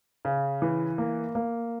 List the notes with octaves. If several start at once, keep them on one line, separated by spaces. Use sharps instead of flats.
C#3
E3
A#3
A#3